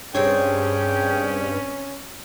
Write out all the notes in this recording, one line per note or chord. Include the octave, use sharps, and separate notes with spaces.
G2 C3 C4 C#4 G#4 C#5 G5